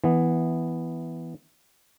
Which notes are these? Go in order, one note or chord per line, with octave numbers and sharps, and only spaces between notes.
E3 B3